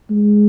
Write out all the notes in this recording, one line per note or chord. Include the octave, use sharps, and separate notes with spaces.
G#3